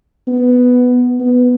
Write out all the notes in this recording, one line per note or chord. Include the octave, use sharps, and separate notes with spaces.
B3
B3